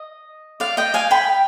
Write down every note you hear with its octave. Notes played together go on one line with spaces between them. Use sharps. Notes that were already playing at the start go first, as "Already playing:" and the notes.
Already playing: D#5
D5 F5
D#5 G5
F5 G#5
G5 B5